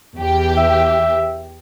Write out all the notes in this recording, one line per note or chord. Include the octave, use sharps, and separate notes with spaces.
E2 G4
E5